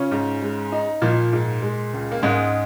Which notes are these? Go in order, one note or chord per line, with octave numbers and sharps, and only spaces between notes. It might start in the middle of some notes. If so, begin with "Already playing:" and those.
Already playing: C#3 C#4 F4
G#2
G#3
D#4
A#2 F3 A#3
G#2
G#3
C#2
A#3
G#2 G#3 C#4